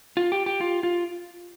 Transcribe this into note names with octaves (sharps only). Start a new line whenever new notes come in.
F4
G4
G4
F4
F4